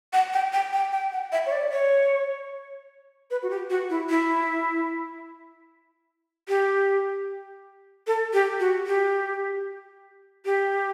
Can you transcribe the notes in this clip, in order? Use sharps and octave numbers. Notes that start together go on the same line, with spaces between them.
F#5
G5
G5
G5
G5
F#5
E5
C#5
D5
C#5
B4
F#4
G4
F#4
E4
E4
G4
A4
G4
F#4
G4
G4